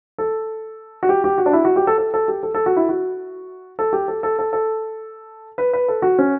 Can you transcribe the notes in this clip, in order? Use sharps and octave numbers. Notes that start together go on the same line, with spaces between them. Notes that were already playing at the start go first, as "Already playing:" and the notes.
A4
F#4
G4
G4
F#4
D4
E4
F#4
G4
A4
A4
A4
G4
A4
A4
F#4
E4
F#4
A4
G4
A4
A4
A4
A4
B4
B4
A4
F#4
C#4